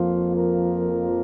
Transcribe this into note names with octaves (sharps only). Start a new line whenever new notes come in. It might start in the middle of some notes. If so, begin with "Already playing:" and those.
Already playing: F2 F3 A#3 F4
A#4